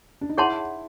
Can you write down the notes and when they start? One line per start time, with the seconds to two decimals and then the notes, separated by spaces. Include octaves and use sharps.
0.21 D4
0.29 D#4
0.37 E4 G#4 C#5 F#5 A5 C6